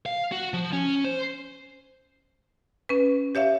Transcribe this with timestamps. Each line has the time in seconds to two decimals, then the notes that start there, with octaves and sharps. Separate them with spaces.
0.06 F5
0.32 F#4
0.53 F3
0.73 C#4
1.04 C5
2.89 C#4 B4
3.35 G4 C#5 E5 F5